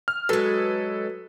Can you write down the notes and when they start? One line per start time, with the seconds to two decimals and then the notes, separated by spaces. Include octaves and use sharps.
0.08 F6
0.29 F#3 G#3 A4 B4